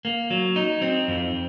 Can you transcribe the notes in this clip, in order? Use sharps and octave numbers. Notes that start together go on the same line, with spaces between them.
A#3
F#3
D#4
C4
F2